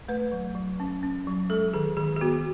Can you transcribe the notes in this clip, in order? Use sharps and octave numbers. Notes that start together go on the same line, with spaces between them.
A3 B4
F#3
F#3
C#4
C#4
F#3
G#3 A4
D#3 G#4
D#3 G#4
G#4
B3 F#4